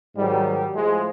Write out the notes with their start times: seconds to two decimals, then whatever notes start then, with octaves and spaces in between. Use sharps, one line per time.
0.16 G#2 D#3 F#3 G3
0.74 A2 F3 G#3